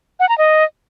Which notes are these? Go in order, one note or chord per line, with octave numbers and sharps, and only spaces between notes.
F#5
A#5
D#5